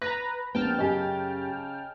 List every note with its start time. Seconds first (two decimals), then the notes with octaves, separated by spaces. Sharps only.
0.02 B4 A#5 A#6
0.55 A#1 B3 G5 A5 F6
0.79 F#2 C#3 G4 D#5 G#5